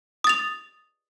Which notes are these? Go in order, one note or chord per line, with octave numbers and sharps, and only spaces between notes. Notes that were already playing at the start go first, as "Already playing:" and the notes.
D#6 A6 F7